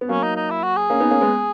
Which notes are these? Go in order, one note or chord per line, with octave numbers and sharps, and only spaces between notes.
B3
F#3 A#3 C#4
D#4
D#4
E4
F#4
G#4
A#3 C#4
B3 D#4
A#3 C#4
G#3 B3